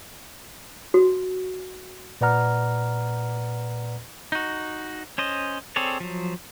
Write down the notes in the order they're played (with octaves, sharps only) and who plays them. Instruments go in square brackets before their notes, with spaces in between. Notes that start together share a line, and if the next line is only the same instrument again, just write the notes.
[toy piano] F#4
[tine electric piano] A#2 B4 D5 F#5 A#5 F6
[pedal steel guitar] D#4 F#4
C#4 C5 D#5
C4 G#4 A4 C#5 D5
F3 F#3